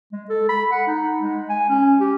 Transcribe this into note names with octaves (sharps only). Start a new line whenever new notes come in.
G#3
A4
B5
F#5
D#4
G#3
G#5
C#4
G4